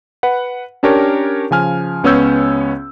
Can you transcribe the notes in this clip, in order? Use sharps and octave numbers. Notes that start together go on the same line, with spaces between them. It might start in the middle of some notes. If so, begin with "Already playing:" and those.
B4 F#5
C#4 D4 G4 A#4 C#5
C#3 F3 G#5 F6
C#2 B3 C#4 C#5 E6 G6